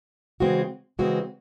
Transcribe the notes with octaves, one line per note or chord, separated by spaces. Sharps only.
C#3 E3 G#3 C4 F#4
C#3 E3 G#3 C4 F#4